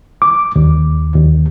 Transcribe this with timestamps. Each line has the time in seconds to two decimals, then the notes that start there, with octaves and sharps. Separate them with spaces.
0.22 D6
0.56 D#2
1.14 D#2